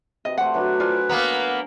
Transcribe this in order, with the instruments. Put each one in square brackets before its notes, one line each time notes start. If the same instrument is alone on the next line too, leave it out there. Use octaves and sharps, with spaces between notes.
[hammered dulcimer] C3 B4 [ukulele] D#5
[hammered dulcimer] A3 C5 D5 [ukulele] F#5
[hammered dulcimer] F#3 D4 [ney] B4
[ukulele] F4 D5 [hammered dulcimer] C5 F#5 G#5
[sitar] A#3 B3 [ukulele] A#5